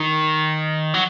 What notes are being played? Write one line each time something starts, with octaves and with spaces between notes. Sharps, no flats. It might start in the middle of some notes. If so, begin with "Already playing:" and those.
Already playing: D#3
F#3